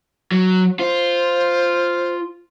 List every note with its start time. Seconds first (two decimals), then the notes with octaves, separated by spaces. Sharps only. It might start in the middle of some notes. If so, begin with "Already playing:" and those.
0.32 F#3
0.79 F4 C5